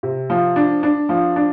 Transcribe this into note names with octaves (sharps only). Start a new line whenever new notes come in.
C3
F3
D4
D4
F3
D4